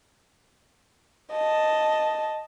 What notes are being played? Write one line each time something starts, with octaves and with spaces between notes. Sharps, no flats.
D#5 A5